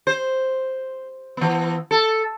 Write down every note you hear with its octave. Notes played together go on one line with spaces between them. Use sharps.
C5
E3 B3
A4